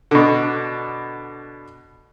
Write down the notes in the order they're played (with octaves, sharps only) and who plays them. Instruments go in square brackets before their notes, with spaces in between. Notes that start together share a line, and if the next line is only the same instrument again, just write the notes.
[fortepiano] B2 D3